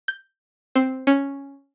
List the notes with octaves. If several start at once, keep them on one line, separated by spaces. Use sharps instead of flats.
G6
C4
C#4